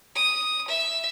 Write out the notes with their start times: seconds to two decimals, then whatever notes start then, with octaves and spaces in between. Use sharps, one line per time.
0.15 D#6
0.68 E5